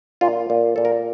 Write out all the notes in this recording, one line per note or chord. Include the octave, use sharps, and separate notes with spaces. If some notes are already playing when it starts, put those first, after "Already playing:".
A#2 F4
A#2
A#2 A4
A#4